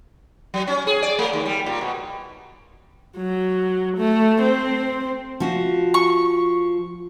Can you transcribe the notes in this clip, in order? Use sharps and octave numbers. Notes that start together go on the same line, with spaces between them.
F#3
C#4
G#4
D5
A3
D#2
G3
A#2
B2
F#3
A3
C4
F3 F#4
C#6